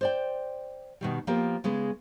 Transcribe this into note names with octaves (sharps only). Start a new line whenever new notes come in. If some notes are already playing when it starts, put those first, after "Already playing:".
C5 D5 G5
B2 D#3 G3
F3 A#3 B3 G4 A#4
C#3 G#3 B3